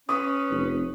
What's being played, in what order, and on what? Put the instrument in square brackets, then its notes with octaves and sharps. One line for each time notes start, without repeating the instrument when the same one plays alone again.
[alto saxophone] C#4 [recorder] B4 [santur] D#6
[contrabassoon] F1